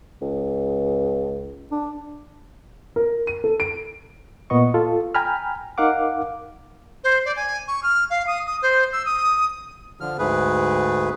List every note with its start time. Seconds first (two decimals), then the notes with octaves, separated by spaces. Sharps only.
0.22 C#2
1.71 D4
2.96 A#4
3.27 D#7
3.44 A4
3.60 D7
4.50 A#2 B3 D#5 C#6
4.74 F4 A4
5.15 G5 G#5 A#5 B5 F6
5.78 D#4 A#4 F5 F#5 D6
7.04 C5
7.25 D5
7.36 G#5
7.68 C#6
7.83 F6
8.10 F5
8.27 D#6
8.46 D#6
8.62 C5
8.92 E6
9.05 D#6
10.00 D3 F3 F6
10.19 D2 G#2 A3 G#4 B4